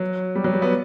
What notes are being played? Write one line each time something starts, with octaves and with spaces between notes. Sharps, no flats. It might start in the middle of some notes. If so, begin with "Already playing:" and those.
Already playing: F#3
G3
F#3
G3
B3